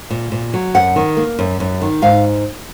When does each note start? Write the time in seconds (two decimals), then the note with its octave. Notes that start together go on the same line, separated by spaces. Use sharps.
0.10 A#2
0.32 A#2
0.54 F#3
0.74 F#2 F#5
0.96 D#3
1.17 A#3
1.39 F#2
1.60 F#2
1.81 D#3
2.02 G#2 F5